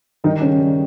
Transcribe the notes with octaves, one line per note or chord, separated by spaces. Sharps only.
D#3 G3 D#4
C#3 C#4
G3